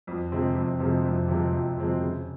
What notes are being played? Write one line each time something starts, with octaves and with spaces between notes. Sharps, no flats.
F2
C3 F3 G#3 C4
F2
C3 F3 G#3 C4
F2
C3 F3 G#3 C4
F2
C3 F3 G#3 C4
C#3